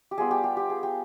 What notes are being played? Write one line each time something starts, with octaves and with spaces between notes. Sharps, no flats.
G4
G3 B3 F4 G#4
G4
G4
G4
G#4
G4